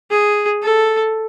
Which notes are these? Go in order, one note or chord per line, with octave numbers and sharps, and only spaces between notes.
G#4
A4